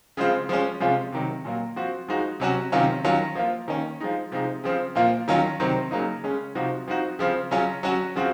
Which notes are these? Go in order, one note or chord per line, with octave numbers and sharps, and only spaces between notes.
C#3 F3 G#3 C4 F4
F3 G#3 C#4
C3 F3 G#3 C#4 F4
C3 D#3 F#3
A#2 F#3 A#3
F3 C4 F#4
F3 G#3 D#4 F#4
C3 F#3 C#4 F#4
C3 D#3 F#3 C#4 F4
D#3 F#3 C#4 F4
F3 A#3 F4
D#3 A#3 C#4
F3 G#3 D#4
C3 F3 G#3 D#4
C#3 F3 C4
A#2 F3 A#3 F4
D#3 F#3 C#4 F4
C3 D#3 F#3 C4
C#3 F#3 A#3 D#4
C#3 G#3 C#4
C3 F3 C4 D#4 F#4
F3 C4 D#4 F#4
C#3 F3 C4
C#3 F#3 C#4 F4
F#3 C#4 F#4
C#3 F3 C4 F#4